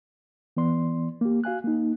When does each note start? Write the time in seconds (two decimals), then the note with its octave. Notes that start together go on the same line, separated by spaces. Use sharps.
0.57 E3 B3 D5 C6
1.21 A#3 G4
1.44 F#4 F5 G#5 F#6
1.64 A#3 D#4